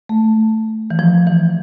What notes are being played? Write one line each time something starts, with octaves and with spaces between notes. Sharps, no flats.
A3
E3
F3
E3